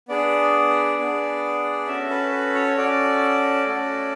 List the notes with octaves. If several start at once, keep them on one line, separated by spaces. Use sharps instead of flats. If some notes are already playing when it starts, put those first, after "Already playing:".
B3 D4 G#4 D5
B3 D4 G#4
C#4 F#4 A4 E5
B4
B4
C#5
C#4 F#4 A4 D5
A3 C#4 F#4 A4